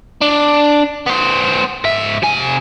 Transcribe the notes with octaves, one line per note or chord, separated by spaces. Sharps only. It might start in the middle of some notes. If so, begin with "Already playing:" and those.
D4
B3 C5
G#2 E5
C3 G#5